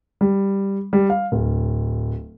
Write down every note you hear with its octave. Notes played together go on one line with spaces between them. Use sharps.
G3
G3
F5
D1